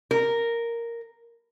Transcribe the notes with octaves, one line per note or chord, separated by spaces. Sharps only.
A#4